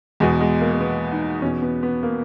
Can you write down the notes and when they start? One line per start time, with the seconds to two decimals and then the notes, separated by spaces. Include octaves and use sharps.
0.20 E2 B2 G#3
0.41 G#3
0.61 A#3
0.73 A#3
0.80 B3
1.12 D#4
1.42 E2 B2 C#4
1.62 B3
1.83 B3
2.03 A#3